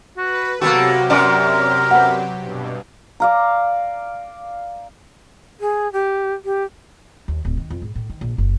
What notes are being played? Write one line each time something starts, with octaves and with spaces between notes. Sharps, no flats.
F#4 B4
C3 F#3 A#3 B3 F#4 G4 A4
F#2 A#4 D5
B4 C5 F#5
G2 B2
D5 F5 A#5
G#4
G4
G4
D#2
D1
D#3
F2
G#2
A2
D#3
A#1
F#1